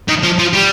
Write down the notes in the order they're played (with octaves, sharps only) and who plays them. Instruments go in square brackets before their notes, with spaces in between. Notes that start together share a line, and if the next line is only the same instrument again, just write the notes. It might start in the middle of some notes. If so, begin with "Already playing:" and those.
[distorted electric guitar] D#3
F3
F3
G3